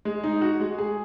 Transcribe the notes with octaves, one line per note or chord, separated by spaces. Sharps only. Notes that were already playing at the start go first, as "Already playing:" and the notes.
G#3
D#4
F#4
G#3
G#4